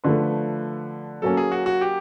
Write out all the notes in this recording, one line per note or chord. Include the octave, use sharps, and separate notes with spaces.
D3 F3 A3 B4
F#3 A#3 C#4 A4
G#4
F#4
F#4
G4